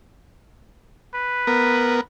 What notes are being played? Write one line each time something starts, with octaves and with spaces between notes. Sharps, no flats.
B4
B3 A#4